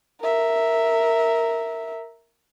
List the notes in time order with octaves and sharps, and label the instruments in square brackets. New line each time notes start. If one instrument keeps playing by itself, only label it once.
[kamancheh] A#4 E5